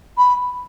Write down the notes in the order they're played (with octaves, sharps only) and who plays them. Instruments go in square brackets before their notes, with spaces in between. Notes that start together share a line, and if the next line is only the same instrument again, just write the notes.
[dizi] B5